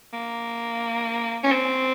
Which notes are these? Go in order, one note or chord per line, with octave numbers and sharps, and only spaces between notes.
A#3
C#4
C4